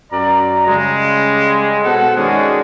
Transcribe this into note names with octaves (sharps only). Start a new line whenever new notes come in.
F#2 D5 A#5
C#3 G3 G#3
B2 A4 C5 F#5
D#3 G#3 C#4 D4 F#4 G#4